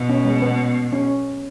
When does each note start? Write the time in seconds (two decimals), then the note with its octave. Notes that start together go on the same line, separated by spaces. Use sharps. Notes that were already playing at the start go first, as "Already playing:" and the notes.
Already playing: B2
0.09 C#4
0.25 G#3
0.42 B3
0.93 C#4